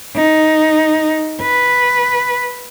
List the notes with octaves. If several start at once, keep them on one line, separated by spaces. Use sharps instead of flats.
D#4
B4